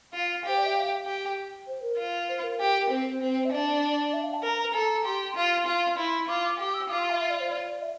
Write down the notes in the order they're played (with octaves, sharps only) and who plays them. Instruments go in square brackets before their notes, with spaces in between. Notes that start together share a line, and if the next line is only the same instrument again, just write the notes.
[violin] F4 [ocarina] F5
[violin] G4 [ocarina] C5
[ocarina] D5
E5
F5
[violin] G4
[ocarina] C5
A#4
[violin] F4
[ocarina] C5
A#4
[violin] G4
[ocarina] A#4
[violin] C4 [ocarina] C5
[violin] C4
[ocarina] E5
[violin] D4 [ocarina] D5
[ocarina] E5
F5
A5
[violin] A#4 [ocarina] A#5
[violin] A4
[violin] G4 [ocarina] C6
[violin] F4 [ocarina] C6
[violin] F4
E4
[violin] F4 [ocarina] D6
[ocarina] D6
[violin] G4 [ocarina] D6
[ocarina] E6
[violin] F4 [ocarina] D6
[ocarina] C6
E5
E5
D5
C5
D5
E5